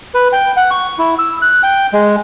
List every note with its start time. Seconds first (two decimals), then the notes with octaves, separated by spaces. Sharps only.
0.14 B4
0.33 G5
0.56 F#5
0.71 C#6
0.99 E4
1.19 E6
1.42 F#6
1.63 G5
1.93 G#3